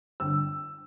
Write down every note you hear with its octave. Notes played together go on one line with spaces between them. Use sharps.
G1 E6